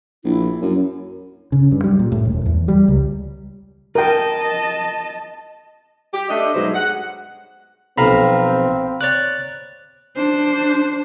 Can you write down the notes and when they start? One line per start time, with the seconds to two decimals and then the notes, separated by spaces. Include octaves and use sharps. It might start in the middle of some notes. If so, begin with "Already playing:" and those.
0.25 A#1 E4
0.61 F#2
1.52 C#3
1.72 G2
1.84 G3
1.99 A#2
2.12 A2
2.25 E1
2.46 E2
2.68 G3
2.88 C#2
3.95 A#4 D#5 G5 A5
6.13 G4
6.29 A3 D4 D#5
6.54 G2 B2 F#3 G#3 D#4 C5
6.74 F#5
7.98 B1 F3 C4 F5 A#5 B5
9.01 C#5 D5 F#6 A6
10.16 D4 C5